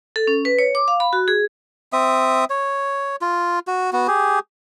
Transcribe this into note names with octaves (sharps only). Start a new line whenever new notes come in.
A4
C#4
B4
C#5
D6
F5
B5
F#4
G#4
C4 E5 D#6
C#5
F4
F#4
B3 F#4
G4 G#4